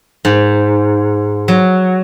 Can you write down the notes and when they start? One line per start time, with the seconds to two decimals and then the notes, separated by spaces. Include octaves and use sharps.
0.25 G#2
1.48 F#3